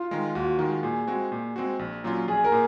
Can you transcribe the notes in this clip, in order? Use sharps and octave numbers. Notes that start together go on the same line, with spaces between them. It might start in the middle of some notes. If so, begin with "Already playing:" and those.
Already playing: F4
D#3 G#3
D#2 F#4
D#3 G#3
A#2 G#4
G#3 C4 F#4
A#2
G#3 C4 F#4
A#1
A#2 F#3 C#4 F4
A#1 G#4
A#4
A#2